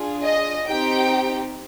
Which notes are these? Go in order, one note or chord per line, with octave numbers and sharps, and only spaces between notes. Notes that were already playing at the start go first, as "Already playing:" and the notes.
Already playing: D4 F4 G#4
D#5
C4 D#4 G4 G5